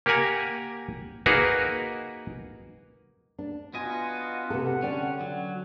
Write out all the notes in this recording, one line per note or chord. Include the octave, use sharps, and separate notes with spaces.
A#3 G4 A#4 F#5 G#5 A#5
A#3 D#4 F#4 G#4 A#4 B4
D4
B3 F4 F#4 D#5 G#5
C3 B3 A4 F#5
D3 C#4 D5 G5
F#3